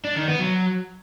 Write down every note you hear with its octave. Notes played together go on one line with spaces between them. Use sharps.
D4
D#3
B3
F#3